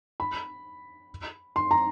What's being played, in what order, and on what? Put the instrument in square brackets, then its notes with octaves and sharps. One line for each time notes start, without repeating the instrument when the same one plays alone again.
[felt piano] B5
C6
A#5